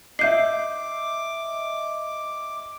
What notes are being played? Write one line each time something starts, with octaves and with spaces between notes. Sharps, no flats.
D#5 E5 D6 G6 C7